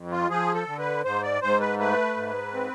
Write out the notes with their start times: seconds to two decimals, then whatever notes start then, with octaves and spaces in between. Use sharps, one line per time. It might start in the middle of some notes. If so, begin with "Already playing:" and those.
Already playing: F2
0.11 F4
0.29 F3 G#4
0.54 A4
0.67 D3
0.79 B4
1.04 G#2 C5
1.22 D5
1.42 G#2 C5
1.60 B4
1.79 A3 B4
2.16 G#2
2.54 C4